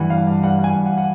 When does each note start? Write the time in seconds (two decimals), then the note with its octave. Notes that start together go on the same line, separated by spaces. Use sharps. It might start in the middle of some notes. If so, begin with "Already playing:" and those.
Already playing: G2 E3 F#5
0.10 G2 F5
0.27 G2
0.43 G2 F#5
0.59 G2
0.64 G#5
0.75 G2
0.86 F#5
0.98 F#5